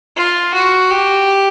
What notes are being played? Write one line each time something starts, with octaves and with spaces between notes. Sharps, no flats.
F4
F#4
G4